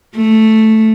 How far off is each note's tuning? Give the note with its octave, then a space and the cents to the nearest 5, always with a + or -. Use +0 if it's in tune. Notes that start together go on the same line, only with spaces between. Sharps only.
A3 +0